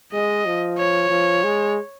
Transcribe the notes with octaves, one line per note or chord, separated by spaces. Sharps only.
G#3 D#5
F3
C#5
F3
G#3